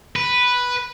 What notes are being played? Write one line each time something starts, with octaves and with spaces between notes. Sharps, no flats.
B4